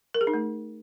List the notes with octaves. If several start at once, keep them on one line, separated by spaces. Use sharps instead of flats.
A#4
G#4
D#4
A3